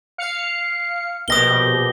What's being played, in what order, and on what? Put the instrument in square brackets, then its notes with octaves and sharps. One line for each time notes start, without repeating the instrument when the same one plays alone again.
[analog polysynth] F5 C#7
[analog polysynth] A#1 B2 G4 [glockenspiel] D#6 A#6 G7